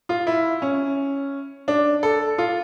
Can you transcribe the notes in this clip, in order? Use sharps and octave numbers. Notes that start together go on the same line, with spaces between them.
F4
E4
C#4
D4
A4
F4